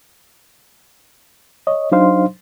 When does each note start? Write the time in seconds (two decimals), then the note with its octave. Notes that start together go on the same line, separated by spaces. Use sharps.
1.67 C#5 D#5
1.92 F#3 D4 D#4 C5 F5 C6